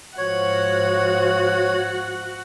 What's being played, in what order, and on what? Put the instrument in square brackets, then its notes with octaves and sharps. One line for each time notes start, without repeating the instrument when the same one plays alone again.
[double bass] G#2 F3 [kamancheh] F#4 F#5 [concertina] C#5